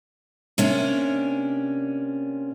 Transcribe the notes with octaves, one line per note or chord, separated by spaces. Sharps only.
C3 A#3 C#4 D4